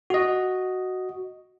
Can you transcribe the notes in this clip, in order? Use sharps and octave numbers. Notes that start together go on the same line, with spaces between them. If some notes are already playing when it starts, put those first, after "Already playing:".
F#4 D#5